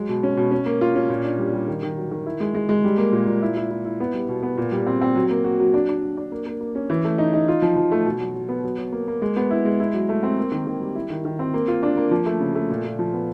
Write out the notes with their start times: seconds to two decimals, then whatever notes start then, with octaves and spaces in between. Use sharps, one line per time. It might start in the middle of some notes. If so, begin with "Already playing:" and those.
Already playing: F#3 G#3
0.09 B2
0.23 C#4
0.37 B2
0.51 C#4
0.66 A#3
0.81 F4
0.95 C#4
1.10 A#2
1.24 D4
1.38 G3
1.53 G3
1.68 D#3
1.83 D#3
1.97 F#3
2.11 D#3
2.26 E4
2.40 G#3
2.55 G#3
2.69 G#3
2.84 G3
2.98 A#3
3.12 A#2
3.27 A#2
3.42 E4
3.56 E4
3.70 E4
3.85 E4
4.00 B3
4.14 G3
4.29 B2
4.43 B3
4.58 A#2
4.72 G3
4.87 C4
5.01 C4
5.16 F#3
5.30 A#3
5.44 F#4
5.60 F#3
5.74 D4
5.89 D4
6.03 F#3
6.17 D4
6.32 A#3
6.46 A#3
6.60 A#3
6.75 C#4
6.90 E3
7.05 A3
7.18 D#4
7.33 D#4
7.48 F4
7.62 F3
7.76 F3
7.92 A3
8.05 B2
8.20 F#3
8.35 F#3
8.49 B3
8.64 F#3
8.78 F#3
8.92 A#3
9.08 A#3
9.22 G#3
9.36 B3
9.50 E4
9.65 G#3
9.80 E4
9.94 F#3
10.09 A3
10.23 C4
10.38 A#3
10.52 D#3
10.67 D#3
10.81 G3
10.95 E4
11.10 D#3
11.25 D#3
11.39 C4
11.54 A#3
11.68 F4
11.83 D4
11.97 A#3
12.11 F3
12.26 A3
12.40 C#3
12.55 A3
12.70 A#2
12.84 A#2
12.99 F3
13.14 B3